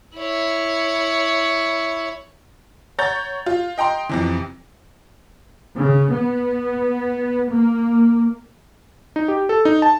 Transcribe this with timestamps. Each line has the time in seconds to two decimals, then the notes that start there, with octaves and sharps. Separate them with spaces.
0.17 E4 C#5
2.99 C#5 F#5 A#5 G6 A6
3.46 F4
3.78 D#5 G5 A#5 C6
4.09 F2 C3 E3
5.77 C#3
6.12 B3
7.50 A#3
9.16 D#4
9.28 G4
9.49 A4
9.65 D#4
9.82 A5